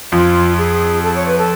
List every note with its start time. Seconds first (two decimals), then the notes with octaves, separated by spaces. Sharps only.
0.12 F2 F3 F4
0.58 G#4
1.03 A4
1.16 C#5
1.27 B4
1.38 A4